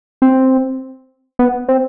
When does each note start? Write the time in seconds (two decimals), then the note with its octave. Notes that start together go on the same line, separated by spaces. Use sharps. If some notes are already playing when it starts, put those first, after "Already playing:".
0.22 C4
1.39 B3
1.68 C4